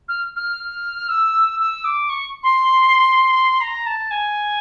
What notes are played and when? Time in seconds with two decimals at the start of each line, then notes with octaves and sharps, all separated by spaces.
0.08 F6
0.36 F6
1.09 E6
1.59 E6
1.85 D6
2.09 C#6
2.43 C6
3.61 A#5
3.86 A5
4.11 G#5